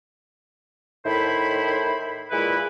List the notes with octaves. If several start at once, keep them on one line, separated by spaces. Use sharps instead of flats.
A2 D#3 E4 C5 B5
A#2 G#3 E4 B4 B5